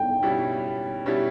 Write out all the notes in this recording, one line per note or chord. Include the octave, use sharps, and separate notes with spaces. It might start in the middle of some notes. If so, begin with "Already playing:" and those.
Already playing: G5
B2 G3 C#4 E4 G4
B2 G3 C#4 E4 G4